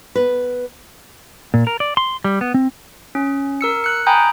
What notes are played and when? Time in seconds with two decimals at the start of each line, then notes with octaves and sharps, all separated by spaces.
0.15 B3 B4
1.54 A#2
1.67 A#4
1.80 D5
1.97 C6
2.24 G3
2.41 B3
2.54 C4
3.15 C#4
3.61 A#4 E6 C#7
3.84 F#6 C#7
4.06 G5 G#5 A#5 B5 D#6 G6